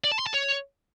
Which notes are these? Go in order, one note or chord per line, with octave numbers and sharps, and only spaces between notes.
D5
A5
C6
A5
C#5